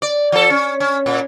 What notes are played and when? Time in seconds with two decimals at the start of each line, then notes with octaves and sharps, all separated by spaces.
0.02 D5
0.32 F3 A4
0.50 C#4
0.80 C#4
1.06 A#2